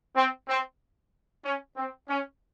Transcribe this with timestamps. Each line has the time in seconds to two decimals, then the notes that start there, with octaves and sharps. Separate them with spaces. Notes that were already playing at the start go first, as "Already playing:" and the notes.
0.16 C4
0.49 C4
1.44 C#4
1.77 C4
2.08 C#4